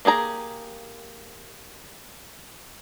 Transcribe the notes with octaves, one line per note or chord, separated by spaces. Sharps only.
A#3 G4 G#4 A#5